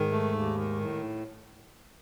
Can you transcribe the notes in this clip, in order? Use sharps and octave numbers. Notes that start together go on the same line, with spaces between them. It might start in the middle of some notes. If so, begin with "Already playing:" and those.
Already playing: G#2 D#3 G#3
A3
D#2
D#3
A2